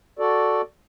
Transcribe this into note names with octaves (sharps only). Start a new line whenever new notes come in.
F#4 A4 D5